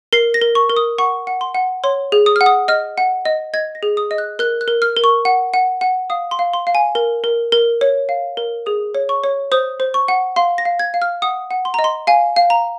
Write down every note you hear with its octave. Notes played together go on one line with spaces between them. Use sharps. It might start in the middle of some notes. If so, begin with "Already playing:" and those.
A#4 C7
A#6
A#4
C#6
A#4
D#6
F#5 C#6
F#5
C6
F#5
C#5 C6
G#4
D#6
F#5 F6
D#6
D#5 F6
F#5
D#5
D#5 G#6
A#6
G#4
D#6
D#5
F#6
A#4 F#6
F#6
A#4
F6
A#4
C#6
F#5
F#5
F#5
F5 D#6
C6
F5
C6
F5
G#5
A#4
A#4
A#4
C#5
F5
A#4
G#4 D#6
C#5
C#6
C#5
C5 D#6
C5
C#6
F#5
F5 C6
A#6
F5
G#6
F5
F6
F#5 D#6
F#5
C6
A#5
D#5
C6
F5 G#5
F5
A#5